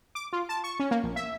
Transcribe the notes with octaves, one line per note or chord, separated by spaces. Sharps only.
D6
F4
A5
C#6
C#4
A#3
A#1
E5